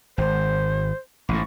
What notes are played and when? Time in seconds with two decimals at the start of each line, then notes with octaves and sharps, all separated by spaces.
0.18 G#1 C5
1.29 A1 G#2 C#6